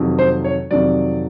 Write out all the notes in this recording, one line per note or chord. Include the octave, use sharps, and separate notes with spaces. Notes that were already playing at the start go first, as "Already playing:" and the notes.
Already playing: F2 C3 D#3 F#3
C5
C#5
F2 C3 D#3 F#3 D5